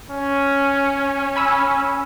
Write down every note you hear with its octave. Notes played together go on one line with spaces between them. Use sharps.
C#4
G#5 B5 E6